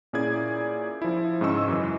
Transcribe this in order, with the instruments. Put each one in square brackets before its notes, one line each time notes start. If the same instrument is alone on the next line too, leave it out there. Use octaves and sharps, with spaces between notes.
[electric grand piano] A#2 C#4 E4 G#4 D5 G#6
F3 E4
G#2 C#3 C#4 D#5 C#6 E6
F#2 E3